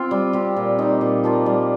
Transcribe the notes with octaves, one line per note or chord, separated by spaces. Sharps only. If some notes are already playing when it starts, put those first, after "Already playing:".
Already playing: C4 F4
G3
C4 G4
A#2
A#3 D#4
A#2
F3 A#3 F4
G3